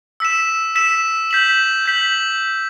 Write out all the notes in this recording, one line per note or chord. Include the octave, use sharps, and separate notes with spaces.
E6 B6 E7
E6 B6 E7
G6 B6 F#7
G6 B6 F#7